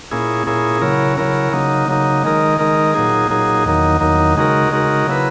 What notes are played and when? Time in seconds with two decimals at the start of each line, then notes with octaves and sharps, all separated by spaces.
0.11 A#2 A#3 C#4 E4 G#4
0.47 A#2 A#3 C#4 E4 G#4
0.82 C#3 F#3 C#4 E4 A#4
1.18 C#3 F#3 C#4 E4 A#4
1.53 C#3 F#3 A#3 D#4
1.88 C#3 F#3 A#3 D#4
2.24 D#3 G#3 D#4 A#4
2.59 D#3 G#3 D#4 A#4
2.94 A#2 F#3 A#3 D#4 G#4
3.30 A#2 F#3 A#3 D#4 G#4
3.66 E2 D#3 F#3 A#3 D#4
4.01 E2 D#3 F#3 A#3 D#4
4.36 C#3 G#3 D#4 F#4 A#4
4.71 C#3 G#3 D#4 F#4 A#4
5.07 C#3 F#3 A#3 E4 B4